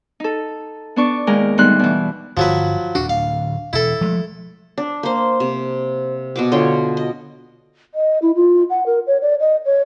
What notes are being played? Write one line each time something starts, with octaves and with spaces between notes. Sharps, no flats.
D#4 A4
B3 D4 C#6 D6
D#2 G#3 A#4 G5 A#5
D2 G3 B3 D#4 C6 F#6
B2 E3
G1 F3 F#3 B4
D1 D2 D4 F#4
F5
E1 E4 A4
F3 G#3 A3
D4
A#3 C5
C3
B2 F#4 D6
D3 F4 C#5 G5
D#5
D#5
E4
F4
F#5
A#4
C#5
D5
D#5
C#5